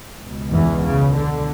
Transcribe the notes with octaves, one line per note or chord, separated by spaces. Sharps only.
C#2 B2
E2 E3
C#3
D3